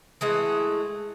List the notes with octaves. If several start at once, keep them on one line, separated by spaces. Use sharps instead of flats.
E3 G#3 A3 F#5